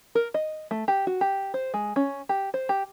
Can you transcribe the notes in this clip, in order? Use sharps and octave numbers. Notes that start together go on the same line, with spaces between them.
A#4
D#5
A3
G4
F#4
G4
C5
G#3
C#4
G4
C5
G4